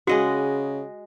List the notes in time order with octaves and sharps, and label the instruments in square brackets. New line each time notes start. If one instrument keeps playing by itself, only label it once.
[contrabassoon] C#3 [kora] G#3 D#5 F#5 [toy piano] F#4